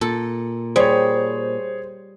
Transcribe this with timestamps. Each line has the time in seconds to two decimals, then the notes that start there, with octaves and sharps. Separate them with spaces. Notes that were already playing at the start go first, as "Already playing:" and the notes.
0.01 A#2 A4
0.76 G3 G#4 C5 C#5